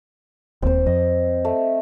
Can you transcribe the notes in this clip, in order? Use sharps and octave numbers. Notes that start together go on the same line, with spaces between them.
D#1 D#2 C4 C5
F2 D#5
A3